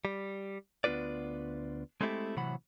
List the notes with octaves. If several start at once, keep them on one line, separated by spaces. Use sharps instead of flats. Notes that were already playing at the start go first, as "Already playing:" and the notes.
G3
D2 B3 D4 F4 B4 D5
G#3 A3 C4 E4 G4 A4
A2 C3 E3 F#3 F#5 B5